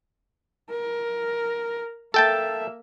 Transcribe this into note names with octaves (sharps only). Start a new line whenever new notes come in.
A#4
A#3 A4 E5 G5 A5